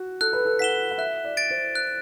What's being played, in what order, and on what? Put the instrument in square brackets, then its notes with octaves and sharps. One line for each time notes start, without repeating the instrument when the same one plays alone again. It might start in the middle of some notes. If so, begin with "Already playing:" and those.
Already playing: [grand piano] F#4
[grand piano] A4 [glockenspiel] F#6
[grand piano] B4
A4
[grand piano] F#5 [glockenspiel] B6 E7 G7
[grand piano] F#5
[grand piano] E5 [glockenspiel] F#6
[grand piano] D5
[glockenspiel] A6 D7
[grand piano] C5
[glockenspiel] F#6